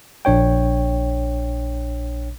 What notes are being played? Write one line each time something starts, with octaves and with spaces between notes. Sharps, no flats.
A#1 D4 C#5 G5